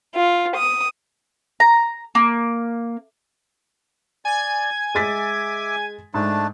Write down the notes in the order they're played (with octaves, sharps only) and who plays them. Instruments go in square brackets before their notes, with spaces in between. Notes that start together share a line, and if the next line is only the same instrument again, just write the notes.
[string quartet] F4
D#6
[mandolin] A#5
A#3
[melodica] D5 [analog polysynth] G#5 G#6
[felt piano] G#3 A6 B6 [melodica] E5 D6
[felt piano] G#2 [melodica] A3 D4 A5